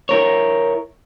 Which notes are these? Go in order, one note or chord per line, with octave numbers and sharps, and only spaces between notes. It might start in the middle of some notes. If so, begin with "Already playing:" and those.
E4 A#4 C#5